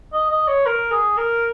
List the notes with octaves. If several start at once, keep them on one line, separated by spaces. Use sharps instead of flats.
D#5
D#5
C#5
A#4
G#4
A#4